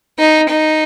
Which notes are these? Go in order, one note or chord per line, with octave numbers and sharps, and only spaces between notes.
D#4
D#4